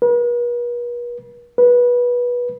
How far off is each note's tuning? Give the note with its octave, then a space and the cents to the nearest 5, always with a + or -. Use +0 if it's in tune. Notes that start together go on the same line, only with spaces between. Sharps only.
B4 -45
B4 -20